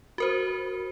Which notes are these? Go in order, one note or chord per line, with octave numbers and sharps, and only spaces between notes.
F#4 A#4 C5